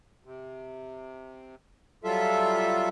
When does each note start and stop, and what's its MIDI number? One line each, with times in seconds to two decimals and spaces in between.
0.24 1.55 48
2.04 2.89 54
2.04 2.89 55
2.04 2.89 65
2.04 2.89 69
2.04 2.89 76